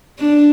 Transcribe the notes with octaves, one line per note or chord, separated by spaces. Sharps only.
D4